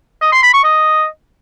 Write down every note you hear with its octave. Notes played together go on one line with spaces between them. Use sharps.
D#5
C6
B5
C#6
D#5